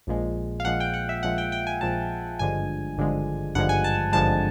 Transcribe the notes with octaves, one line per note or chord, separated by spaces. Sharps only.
A#1 A#2 F3 G#3
F5
A#1 A#2 F3 G#3 F#5
G5
F#5
E5
A#1 A#2 F3 G#3 F#5
G5
G5
G#5
A#1 A#2 F3 G#3 A5
G#1 G2 D3 F3 G#3 G#5
G#1 G2 D3 F3 G#3
G#1 G2 D3 F3 G#3 F#5
G#5
A5
G#1 G2 D3 F3 G#3 A5